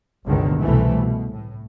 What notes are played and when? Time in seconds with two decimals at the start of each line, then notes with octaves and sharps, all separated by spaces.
0.25 G1 C#2 B2 D3 D#3
0.60 C2 B2 E3 A3
0.95 B2
1.33 A2